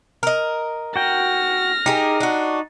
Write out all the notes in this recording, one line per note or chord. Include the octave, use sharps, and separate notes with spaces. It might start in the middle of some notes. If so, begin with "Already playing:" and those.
A#4 D#5
F#4 G5 F6 A#6
D#4 G4 G#4 A#4
D4 F#4